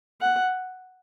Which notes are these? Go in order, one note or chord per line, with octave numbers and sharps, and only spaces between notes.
F#5